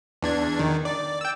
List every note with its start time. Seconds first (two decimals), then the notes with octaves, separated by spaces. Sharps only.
0.22 E2 D4 G#6
0.60 D#3
0.85 D5
1.21 G5 E6